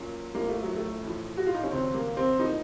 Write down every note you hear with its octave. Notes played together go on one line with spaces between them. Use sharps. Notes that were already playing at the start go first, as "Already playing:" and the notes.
Already playing: A#2 F#3 A#3 C#4 F4
A#1 A2 F3 A#3
A3
F#3
A3
A1 A2 F3
F#4
F4
D#4
C#4
F1 D#2 C#3 F#3 C4
A#3
C4
A2 F3 A#3 D#4